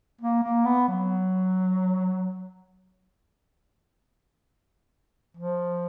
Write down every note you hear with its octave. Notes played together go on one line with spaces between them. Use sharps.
A#3
A#3
B3
F#3
F3